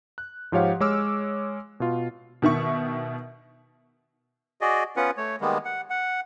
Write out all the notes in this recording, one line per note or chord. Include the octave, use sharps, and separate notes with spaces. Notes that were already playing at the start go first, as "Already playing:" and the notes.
F#6
G#2 F3 G4 C#5 F5 F#5
G#3 C#5 D6 E6 F6
B2 F4
B2 D#3 E5 C#6
F#4 G#4 D5 D#5
B3 C#4 F4 B4 F#5
A3 C#5
D#3 G3 G#3 A#3 B3
F#5
F#5